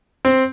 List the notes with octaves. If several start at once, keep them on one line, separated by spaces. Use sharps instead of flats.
C4